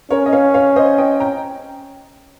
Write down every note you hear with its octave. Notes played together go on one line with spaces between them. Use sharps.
C#4 A#4 C#5
D#5
C#5 F5
C#5 F5
C5 D#5
D#5 G5
G5 A#5